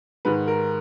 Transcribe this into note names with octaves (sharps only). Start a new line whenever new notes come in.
G#2 D#3 B4
A#4